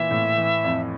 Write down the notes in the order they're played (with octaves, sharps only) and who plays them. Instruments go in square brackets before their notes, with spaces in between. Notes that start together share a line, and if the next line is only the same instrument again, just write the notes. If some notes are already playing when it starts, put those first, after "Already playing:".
Already playing: [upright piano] A#2 E3 [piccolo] E5
[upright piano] A2
E3
F2